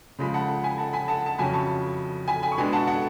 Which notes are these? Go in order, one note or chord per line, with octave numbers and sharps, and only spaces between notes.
C#3 F3 G#3 B5
F#5 A5
G#5 B5
F#5 A5
G#5 B5
F#5 A5
A5
F2 C#3 F#3 C#4 G#5 B5
A5 C#6
G#5 B5
G#5 B5
C#6
B2 G#3 D4 G#5 B5
F#5 A5
F#5 A5